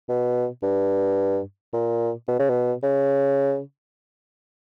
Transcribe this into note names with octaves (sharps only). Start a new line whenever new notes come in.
B2
G2
A#2
B2
C#3
B2
C#3